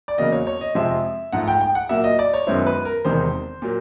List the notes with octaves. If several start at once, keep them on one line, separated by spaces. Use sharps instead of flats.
D5
E2 C#3 F#3 A#3 D#5
C#5
C#5
D#5
F2 C3 F3 G#3 C4 E5
G#2 F3 A3 F#5
G5
G5
F#5
A#2 F#3 A#3 E5
D#5
D5
C#5
F#2 D#3 G#3 B3 E4 C5
B4
A#4
E1 E2 C3 D#3 G#3 C5
A#2 F#3 A#3